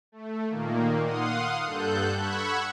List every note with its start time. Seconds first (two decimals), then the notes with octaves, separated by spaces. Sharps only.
0.12 A3
0.48 A#2 D#3 A#3
1.03 F5 F#5 C6 D#6
1.65 G2 A4 F#6 G6
2.18 F#5 B5 C#6 E6 F#6 G#6